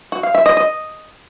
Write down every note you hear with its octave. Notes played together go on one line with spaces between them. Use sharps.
F#4
F5
E5
D#5
D#5